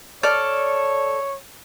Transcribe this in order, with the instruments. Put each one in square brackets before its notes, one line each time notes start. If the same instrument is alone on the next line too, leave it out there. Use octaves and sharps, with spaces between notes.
[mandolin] A4 D5 F6 [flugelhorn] C#5